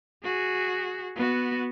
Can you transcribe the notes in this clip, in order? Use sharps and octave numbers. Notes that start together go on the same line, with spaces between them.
F#4 G#4
B3 F#4